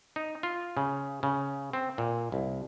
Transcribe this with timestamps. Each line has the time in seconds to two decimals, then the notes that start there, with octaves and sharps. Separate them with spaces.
0.16 D#4
0.43 F4
0.77 C#3
1.23 C#3
1.73 C4
1.98 A#2
2.32 C2